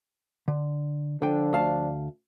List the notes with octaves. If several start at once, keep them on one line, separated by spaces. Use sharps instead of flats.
D3
D3 F3 D4 G5
D2 F5 A5